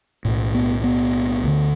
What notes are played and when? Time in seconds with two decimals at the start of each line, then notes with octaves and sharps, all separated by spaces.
0.25 B1 A2
0.54 B3
0.84 B3
1.44 D2 D3